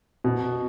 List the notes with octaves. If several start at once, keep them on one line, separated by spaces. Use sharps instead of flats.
B2